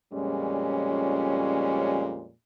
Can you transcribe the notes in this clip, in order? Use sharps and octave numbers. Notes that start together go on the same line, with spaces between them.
F2 A#2 G3 G#3 C#4